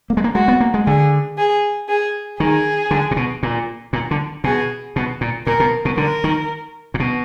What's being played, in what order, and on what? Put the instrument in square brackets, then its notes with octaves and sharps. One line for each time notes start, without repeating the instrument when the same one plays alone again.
[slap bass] A#3
G#3
A#3
[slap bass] G#3 [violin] F#4
[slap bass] B3
A#3
G#3
[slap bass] D3 [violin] G#4
[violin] G#4
G#4
[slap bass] D#3 [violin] G#4
[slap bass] D3
A#2
B2
A#2
A#2
D3
[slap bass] B2 [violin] G#4
[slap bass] B2
A#2
[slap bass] A#2 [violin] A#4
[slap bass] B2
B2
[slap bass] D3 [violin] A#4
[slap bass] D#3
A#2
B2